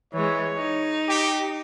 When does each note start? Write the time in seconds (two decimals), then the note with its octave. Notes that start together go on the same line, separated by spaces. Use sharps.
0.13 E3 G#3 C#5
0.57 D#4
1.08 G4